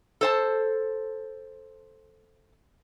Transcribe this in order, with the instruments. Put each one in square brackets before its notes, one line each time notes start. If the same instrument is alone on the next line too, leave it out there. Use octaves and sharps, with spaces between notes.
[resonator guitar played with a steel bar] A4 C5 A5